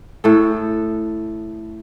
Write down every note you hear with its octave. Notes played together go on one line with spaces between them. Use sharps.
A2 A4